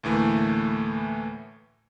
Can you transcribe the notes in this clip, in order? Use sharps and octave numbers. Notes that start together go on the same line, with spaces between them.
D2 A2 E3 A3 A#3